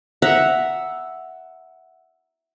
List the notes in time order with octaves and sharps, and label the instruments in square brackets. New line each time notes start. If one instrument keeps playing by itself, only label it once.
[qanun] E5 F#5 A#5